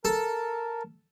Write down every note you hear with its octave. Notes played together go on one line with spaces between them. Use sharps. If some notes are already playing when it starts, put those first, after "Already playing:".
A4 A#4 A5